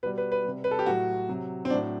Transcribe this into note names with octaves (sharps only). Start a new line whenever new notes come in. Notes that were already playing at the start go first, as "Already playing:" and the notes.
B2 G3 B4
B4
B4
C3 G3
B4
A4
G4
A2 F#3 F#4
C3 F#3
C4
A2 F#3 D4